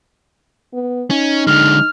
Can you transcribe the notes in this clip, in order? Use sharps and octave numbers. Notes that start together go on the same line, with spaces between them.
B3
C#4 D#4
D3 G#3 F6